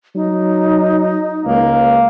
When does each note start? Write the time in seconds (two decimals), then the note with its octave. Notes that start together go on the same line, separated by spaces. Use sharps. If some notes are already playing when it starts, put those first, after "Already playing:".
0.15 F#3 D#4
1.46 C#2 A#3